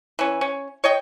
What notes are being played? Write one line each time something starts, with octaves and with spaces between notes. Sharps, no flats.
E3 C#4
C#4
C#5 D#5 G5